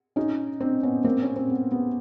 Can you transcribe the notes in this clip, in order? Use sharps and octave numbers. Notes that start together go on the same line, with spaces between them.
C#4 D#4
C4 D4
B3 C#4
A#3 C4
C#4
C4
B3
B3